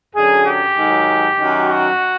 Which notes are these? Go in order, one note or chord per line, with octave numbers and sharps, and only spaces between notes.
F#2 D3 F#3 G#4
G4
G#2 D#3 F#3
F#2 D#3 F#3
F#4